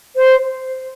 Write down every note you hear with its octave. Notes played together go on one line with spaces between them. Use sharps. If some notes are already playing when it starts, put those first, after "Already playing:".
C5